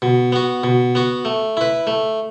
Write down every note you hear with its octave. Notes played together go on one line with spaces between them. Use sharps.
B2
B3 F#4
B2
B3 F#4
A3
E4 B4
A3